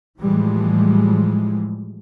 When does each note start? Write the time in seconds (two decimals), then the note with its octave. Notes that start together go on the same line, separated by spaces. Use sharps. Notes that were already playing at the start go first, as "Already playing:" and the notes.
0.18 A2 E3 F3 G3 G#3